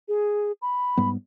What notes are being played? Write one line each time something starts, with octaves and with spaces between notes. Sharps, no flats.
G#4
B5
G#2 G3 B3